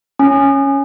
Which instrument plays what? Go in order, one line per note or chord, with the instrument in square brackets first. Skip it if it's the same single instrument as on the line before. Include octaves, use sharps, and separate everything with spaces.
[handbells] C#4